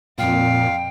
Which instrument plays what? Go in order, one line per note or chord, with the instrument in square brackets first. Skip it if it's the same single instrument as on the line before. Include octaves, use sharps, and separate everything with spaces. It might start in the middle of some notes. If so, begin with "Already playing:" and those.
[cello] F2 [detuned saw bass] A#2 [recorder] F5 [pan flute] G5